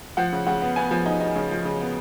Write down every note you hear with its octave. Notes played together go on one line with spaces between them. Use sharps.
F3 F#5
C#3
C#3 F#5
B3
B3 G#5
F3
D#4
D#4
C#3
F3
C#3
B3